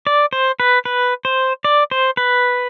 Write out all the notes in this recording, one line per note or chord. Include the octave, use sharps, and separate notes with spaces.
D5
C5
B4
B4
C5
D5
C5
B4